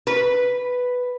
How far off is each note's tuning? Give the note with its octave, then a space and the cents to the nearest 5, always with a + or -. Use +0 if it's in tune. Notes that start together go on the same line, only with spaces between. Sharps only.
B4 +0